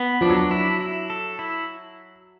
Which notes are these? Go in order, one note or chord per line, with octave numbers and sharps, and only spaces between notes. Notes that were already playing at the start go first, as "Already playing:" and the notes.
Already playing: B3
F3 D4
F#3
E4
E4
A4
E4